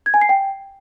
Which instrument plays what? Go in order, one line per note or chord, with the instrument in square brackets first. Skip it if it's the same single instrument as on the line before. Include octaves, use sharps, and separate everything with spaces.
[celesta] G#6
G#5
C7
G5